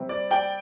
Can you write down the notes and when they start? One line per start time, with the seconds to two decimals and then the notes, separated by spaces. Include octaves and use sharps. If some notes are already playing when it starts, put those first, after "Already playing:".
Already playing: C3 G3 C4
0.09 D5
0.31 D5 G5